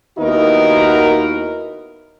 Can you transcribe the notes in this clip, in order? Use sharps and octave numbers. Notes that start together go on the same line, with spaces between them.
D#2 B3 D#4 E4 F#4 A#4